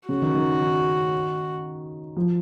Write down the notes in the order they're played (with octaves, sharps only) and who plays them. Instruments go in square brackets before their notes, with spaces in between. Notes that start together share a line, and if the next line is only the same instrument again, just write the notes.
[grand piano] C#3 [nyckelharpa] F#4
[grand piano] D#3
D#3
D#3
F3